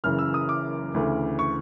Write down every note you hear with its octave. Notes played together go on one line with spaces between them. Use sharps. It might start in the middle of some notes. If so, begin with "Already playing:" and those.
F#1 F#2 C#3 E3 F6
E6
D#6
D6
D2 C#3 E3 A3
C#6